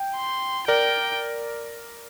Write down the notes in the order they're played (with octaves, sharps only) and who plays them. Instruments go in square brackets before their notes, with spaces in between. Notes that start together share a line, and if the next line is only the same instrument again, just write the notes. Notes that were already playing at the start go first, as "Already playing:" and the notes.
Already playing: [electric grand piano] G5
[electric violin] C6
[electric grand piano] A#4 D5 [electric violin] G5